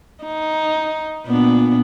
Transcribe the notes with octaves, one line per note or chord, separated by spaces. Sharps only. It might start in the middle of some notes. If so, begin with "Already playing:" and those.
D#4
A#2 B3 D4